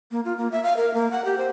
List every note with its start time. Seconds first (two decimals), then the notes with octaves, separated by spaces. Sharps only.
0.11 A#3
0.25 F4
0.37 A#3
0.52 E5
0.63 F5
0.77 A#4
0.94 A#3
1.11 F#5
1.25 G4
1.38 C5